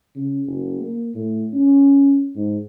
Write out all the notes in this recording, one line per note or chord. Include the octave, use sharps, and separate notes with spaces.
C#3
F#1
A#3
A2
C#4
G#2